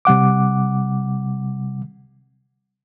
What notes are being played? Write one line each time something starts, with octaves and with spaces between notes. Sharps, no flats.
C3 G3 F#5 D6